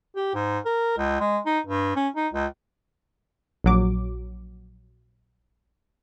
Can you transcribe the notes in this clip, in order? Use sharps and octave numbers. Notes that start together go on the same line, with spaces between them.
G4
G#2
A#4
C#2
G#3
D#4
G2
C#4
D#4
C#2
A#1 F#3 D6